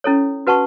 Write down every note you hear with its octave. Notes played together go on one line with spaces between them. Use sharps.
C#4 E4 A4 C#5
F#4 B4 F#5 A5 C#6